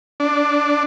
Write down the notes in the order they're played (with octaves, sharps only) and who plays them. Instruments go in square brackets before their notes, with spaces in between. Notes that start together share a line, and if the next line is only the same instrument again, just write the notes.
[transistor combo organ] D4